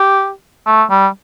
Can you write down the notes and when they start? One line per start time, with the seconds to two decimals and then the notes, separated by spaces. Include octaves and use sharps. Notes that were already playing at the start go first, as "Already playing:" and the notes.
Already playing: G4
0.66 A3
0.91 G3